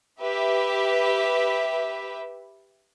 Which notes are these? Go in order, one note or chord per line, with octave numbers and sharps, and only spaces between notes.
G4 B4 E5